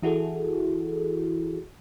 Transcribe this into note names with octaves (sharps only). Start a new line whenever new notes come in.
E3 E4 F#4 G#4 A4